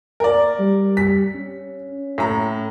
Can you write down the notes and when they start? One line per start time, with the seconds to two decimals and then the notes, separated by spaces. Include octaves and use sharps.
0.20 A#4 D5
0.59 G3
0.97 B6
1.35 C#4
2.18 A2 A#5